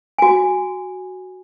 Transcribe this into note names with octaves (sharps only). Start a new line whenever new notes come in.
F#4 G#5